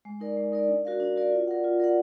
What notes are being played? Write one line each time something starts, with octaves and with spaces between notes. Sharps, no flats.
G#3
D#4 A#4 D5
G#3
D#4 A#4 D5
D4
F#4 A#4 D5 F5
D4
F#4 A#4 D5 F5
F4
A#4 D5 F#5
F4
A#4 D5 F#5